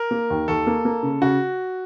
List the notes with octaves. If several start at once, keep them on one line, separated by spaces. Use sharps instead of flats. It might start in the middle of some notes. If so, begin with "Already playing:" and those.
Already playing: A#4
A#3
D#2
D#2 A4
A#3
A#3
C#3
C#3 F#4